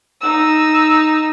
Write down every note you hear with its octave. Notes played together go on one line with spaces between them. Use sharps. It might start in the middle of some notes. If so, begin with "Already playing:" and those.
D#4 E6